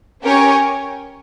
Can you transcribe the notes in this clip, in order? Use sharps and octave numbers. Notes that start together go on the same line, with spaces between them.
C#4 G4 A#4 C#5 G#5